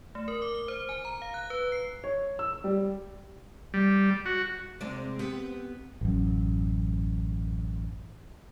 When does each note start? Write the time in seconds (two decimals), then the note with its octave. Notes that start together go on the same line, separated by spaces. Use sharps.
0.15 A3
0.28 A#4
0.42 D6
0.55 G7
0.68 C5
0.89 G#5
1.05 A#5
1.22 F5
1.34 F#6
1.50 B4
1.72 C7
2.04 C#5
2.39 E6
2.64 G3
3.74 G3
4.26 F#4
4.81 C3 G#3 C4 D5
5.19 B3 G4
6.01 A1 F#2